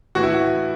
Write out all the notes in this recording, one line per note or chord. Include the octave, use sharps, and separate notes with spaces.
A2 E3 F#4
E4